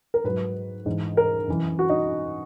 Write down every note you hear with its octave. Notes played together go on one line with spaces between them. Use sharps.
A#4
G#2 F#3 B4
G#2 E3
A#4
F#2 E3
F#4
D#4